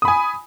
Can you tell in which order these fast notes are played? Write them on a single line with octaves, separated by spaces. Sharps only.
D#6 B5 G#5